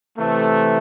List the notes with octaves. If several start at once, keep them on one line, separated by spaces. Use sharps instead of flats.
C3 E3 A3